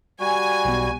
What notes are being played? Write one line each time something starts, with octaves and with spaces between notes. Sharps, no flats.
G3 F#4 G#5
B1 B2